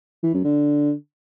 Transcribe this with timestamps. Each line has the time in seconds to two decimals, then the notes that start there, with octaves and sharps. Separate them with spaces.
0.24 E3
0.34 F#2
0.44 D3